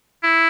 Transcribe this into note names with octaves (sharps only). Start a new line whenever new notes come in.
E4